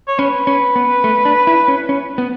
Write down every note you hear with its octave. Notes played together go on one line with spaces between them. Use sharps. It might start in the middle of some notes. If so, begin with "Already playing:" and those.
C#5
C#4 B4
C#4
B3
A3
D4
E4
C#4
C#4
B3